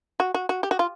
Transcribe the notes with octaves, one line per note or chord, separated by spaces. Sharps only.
F#4
F#4
F#4
G4
F#4
F4